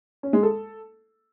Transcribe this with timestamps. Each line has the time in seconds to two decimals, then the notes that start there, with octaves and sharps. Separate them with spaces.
0.23 C#4
0.33 G#3
0.43 A4